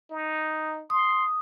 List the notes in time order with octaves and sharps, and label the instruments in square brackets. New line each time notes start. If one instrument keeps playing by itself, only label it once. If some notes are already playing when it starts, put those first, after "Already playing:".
[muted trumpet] D#4
[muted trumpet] C6 [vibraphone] D#6